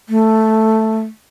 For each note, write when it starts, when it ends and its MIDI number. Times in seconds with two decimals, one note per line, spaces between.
0.09 0.99 57